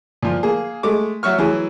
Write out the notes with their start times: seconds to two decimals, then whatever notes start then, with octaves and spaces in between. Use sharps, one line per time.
0.23 A#2 F3
0.43 A#3 G#4
0.83 G#3 A3 D6
1.23 F#3 E5 C#6 F6
1.38 E3 F#3 G#4